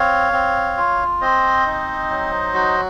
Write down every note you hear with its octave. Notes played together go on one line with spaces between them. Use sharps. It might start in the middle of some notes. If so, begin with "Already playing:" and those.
Already playing: C4 C#5 F5
C4
F4
C4 C5 D#5
D#4
F#3
F#4